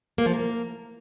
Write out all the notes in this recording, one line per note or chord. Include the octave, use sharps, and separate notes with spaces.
A#3
F3
A#3